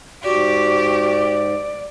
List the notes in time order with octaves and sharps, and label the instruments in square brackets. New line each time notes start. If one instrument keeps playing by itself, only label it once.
[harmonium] G#2 [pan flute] F#4 [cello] G4 [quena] D5